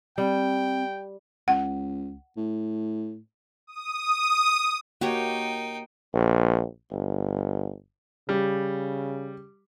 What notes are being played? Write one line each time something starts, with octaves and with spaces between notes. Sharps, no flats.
G3 C4 G5
C#2 F#5
A2
D#6
A#3 D#4 F#4 G4 C#5 G5
A#1
G1
C#3 G3